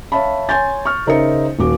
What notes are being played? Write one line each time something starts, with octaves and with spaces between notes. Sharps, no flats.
C#5 E5 F5 A5 B5
C#5 G#5 C6 G6 A6
C#6 F6
C#3 D#4 A#4 C5 E5 C#7
D#1 F#4 D6